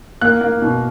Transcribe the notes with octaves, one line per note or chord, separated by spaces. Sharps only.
A#3 F#6
A#3
B2